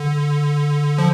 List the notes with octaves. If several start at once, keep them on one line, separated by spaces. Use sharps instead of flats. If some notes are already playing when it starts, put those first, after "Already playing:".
Already playing: D3
F3